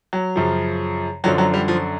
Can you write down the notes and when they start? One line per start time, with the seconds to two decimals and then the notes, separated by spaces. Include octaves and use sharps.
0.13 F#3
0.36 F#2 C#3 F3
1.24 F#2 D3 F3 F#3
1.38 F#3
1.54 G3
1.68 F3